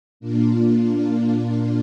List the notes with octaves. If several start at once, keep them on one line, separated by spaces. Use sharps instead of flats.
A#2 A#3 D4 F4